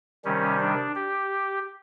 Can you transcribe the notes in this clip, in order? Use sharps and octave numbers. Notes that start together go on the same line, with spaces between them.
C3 D#3 G3 C#4
D4
G4